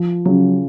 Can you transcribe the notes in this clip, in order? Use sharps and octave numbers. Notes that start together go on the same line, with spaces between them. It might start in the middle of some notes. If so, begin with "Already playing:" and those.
Already playing: F3
C#3 F#3